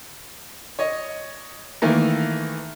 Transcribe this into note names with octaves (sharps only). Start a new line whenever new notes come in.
C#5 D#5
D#3 E3 A3 A#3